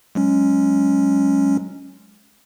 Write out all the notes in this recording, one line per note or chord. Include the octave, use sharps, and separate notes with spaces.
F#3 G#3 C#4